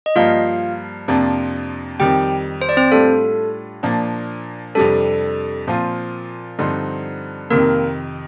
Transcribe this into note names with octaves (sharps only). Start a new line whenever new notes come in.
D#5
G2 F3 A#3 F4 F5
F2 C3 F3 A#3 D4
F2 D#3 G3 G4 G5
C5
D5
C4 C5
A2 G3 D4 F4 A4
A#2 F3 A#3 D4
F2 C3 G3 D4 A4
A#2 F3 C4 F4
G2 D3 F3 C4 D#4
F2 C3 D#3 A#3 A#4